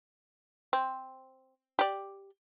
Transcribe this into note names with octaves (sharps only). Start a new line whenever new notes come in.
C4
G4 D5